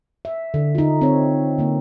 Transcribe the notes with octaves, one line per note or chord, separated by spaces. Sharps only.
E5
D3
D#4 F4
C4 C#5
D3 A#3